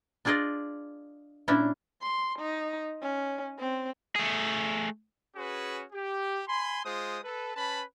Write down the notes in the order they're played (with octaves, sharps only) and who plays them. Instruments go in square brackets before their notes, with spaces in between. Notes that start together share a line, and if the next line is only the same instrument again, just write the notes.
[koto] D4 F4 G#4 D5 D#5
A#2 C#4 D4 E4
[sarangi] C6
D#4
C#4
C4
[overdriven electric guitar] A3 G#4
[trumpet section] C#4 F#4 G#4 B4
G4
G#5 B5 C6
G#3 F4 C5 D#6
A4 B4
C#4 B4 A5 B5